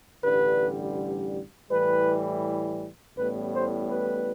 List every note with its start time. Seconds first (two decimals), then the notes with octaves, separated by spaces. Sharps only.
0.24 A1 G2 D3 G3 B4
1.71 A2 E3 G3 B4
3.17 A1 A2 G3 B3 B4
3.55 C5
3.91 B4